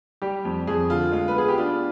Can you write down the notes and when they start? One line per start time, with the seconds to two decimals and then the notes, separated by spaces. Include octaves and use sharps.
0.22 G3 G4
0.45 F2
0.67 F2 G#4
0.90 D3 F4
1.12 G#3 F4
1.28 B4
1.36 B3 G#4
1.48 G4
1.58 D4 F4